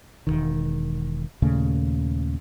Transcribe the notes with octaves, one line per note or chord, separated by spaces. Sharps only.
E1 A#1 D#3
D#2 A#2 C#3 A3